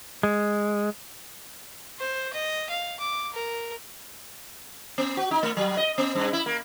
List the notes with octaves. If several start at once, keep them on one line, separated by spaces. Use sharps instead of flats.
G#3
C5
D#5
F5
D6
A#4
B3
F#4
D#4
A3
F#3
D#5
B3
G2
E4
A#3